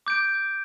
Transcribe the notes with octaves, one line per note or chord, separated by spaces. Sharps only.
D6 G6 D7